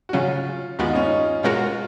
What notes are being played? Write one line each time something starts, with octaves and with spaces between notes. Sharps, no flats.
F#4
C#3 F#3 C#4 F4
D#2 D#3 G#3 B3 F4 F#4
D#4
C#4
D#4
B2 G#3 C#4 F4 F#4 A#4